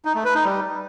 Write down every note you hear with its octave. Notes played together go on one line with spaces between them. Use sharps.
D#4
A3
B4
D#4
G3